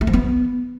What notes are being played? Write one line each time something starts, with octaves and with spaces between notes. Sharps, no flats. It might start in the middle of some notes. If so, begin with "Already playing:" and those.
A3
F3
B3